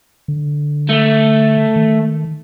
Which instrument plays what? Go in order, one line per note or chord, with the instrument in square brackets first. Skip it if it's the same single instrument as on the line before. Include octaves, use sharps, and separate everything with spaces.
[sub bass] D3
[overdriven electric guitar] A3
[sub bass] D#3